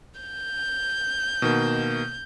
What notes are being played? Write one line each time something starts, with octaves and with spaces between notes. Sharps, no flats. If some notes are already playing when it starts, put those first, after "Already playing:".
G6
B2 D#3 A#3